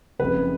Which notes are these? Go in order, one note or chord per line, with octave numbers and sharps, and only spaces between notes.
F#1 F2 C#3 B4